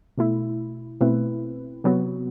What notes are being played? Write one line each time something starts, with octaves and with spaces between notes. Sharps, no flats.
B2 A3 E4
B2 A3 C4 E4 B4
C3 F#3 B3 F#4